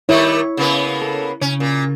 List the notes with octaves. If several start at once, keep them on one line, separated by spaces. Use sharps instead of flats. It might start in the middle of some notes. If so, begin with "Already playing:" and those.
D#3 G3 A3 E4 C#5
C#3 A#3 B3
A4
C#3 C#4
A#2